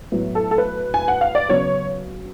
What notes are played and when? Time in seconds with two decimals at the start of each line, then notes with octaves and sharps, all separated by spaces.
0.12 A2 F#3 B3
0.35 A4
0.51 A4
0.58 B4
0.94 G#5
1.08 F#5
1.21 F5
1.35 D5
1.49 C#3 F#3 B3 C#5